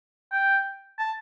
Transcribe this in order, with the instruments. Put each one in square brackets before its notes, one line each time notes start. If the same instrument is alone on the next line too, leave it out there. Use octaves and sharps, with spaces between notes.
[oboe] G5
A5